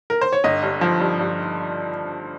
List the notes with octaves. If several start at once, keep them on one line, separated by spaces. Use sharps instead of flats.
A#4
C5
C#5
G1 D#5
G2
F3
G2
G2